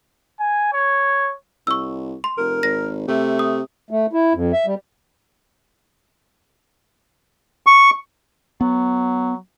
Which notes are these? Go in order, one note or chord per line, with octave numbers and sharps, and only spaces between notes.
G#5
C#5
C2 C#6 E6
C6
F1 A#4
G#1 A#6
C3 A3
D#6
A3
E4
F2
E5
G3
C#6
F#3 B3